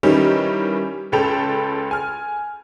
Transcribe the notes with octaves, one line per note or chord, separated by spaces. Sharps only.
D#3 E3 G3 C#4 D#4 E4
C#2 C#4 A4 G5 B5 F7
G#5 F6